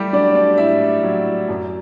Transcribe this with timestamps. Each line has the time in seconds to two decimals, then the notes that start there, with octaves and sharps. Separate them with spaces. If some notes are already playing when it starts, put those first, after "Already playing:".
Already playing: G3 A3 G4
0.13 F#3 D4 D5
0.35 D4 D5
0.58 A2 E4 E5
1.03 F#3
1.49 F#2